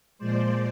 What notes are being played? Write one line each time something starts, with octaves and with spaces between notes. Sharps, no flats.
A#2 F3 G#3 C5 D5